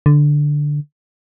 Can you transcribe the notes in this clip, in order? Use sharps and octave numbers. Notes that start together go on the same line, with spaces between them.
D3